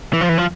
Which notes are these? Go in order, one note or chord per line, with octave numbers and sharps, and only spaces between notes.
E3
F3
E3
F3